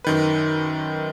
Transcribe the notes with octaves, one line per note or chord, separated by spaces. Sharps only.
F#2 D#3 B4